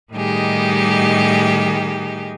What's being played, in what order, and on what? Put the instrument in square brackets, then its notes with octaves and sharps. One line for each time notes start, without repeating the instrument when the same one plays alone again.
[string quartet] A2 D#3 G3 D#4 G4 G#4